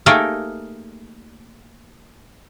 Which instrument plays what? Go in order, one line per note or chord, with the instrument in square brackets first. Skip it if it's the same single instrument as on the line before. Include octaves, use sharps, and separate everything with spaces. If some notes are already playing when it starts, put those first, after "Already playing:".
[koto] A3 A#3 D#4 G4 G#4 A#4